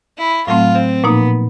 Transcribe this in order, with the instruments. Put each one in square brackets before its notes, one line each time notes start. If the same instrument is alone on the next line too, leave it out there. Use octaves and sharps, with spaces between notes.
[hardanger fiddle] E4
[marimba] A2 F#3 A3 C4 [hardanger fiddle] F4
[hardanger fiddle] C4
[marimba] A#2 F3 A#3 D#4 [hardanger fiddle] B3